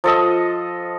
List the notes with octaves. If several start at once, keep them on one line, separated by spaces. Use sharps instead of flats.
F3 A4 D#5